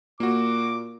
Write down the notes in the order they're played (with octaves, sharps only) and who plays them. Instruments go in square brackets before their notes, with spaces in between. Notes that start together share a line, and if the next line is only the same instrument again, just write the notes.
[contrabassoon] A#2 [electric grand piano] A#3 F#4 [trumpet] D6